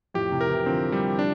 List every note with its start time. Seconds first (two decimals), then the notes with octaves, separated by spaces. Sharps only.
0.14 F2 A2 G4
0.32 A2 C3
0.41 A#4
0.49 C3 E3
0.66 D3 F3 C4
0.92 G3
1.19 D4